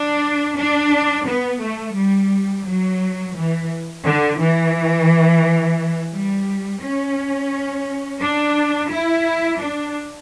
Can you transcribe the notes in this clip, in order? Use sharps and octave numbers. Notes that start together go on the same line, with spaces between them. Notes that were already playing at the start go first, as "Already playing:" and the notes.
Already playing: D4
D4
B3
A3
G3
F#3
E3
D3
E3
G3
C#4
D4
E4
D4